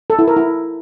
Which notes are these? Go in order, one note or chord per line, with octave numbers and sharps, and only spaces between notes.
A4
E4
A#4
E4